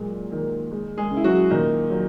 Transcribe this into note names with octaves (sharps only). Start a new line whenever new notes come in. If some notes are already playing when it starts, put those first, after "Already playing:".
Already playing: A#2 F#3 G#3
D#3
G#3
G#3 G#4
C#3
E4
F#3 F#4
A#2 D#3 D#4
F#3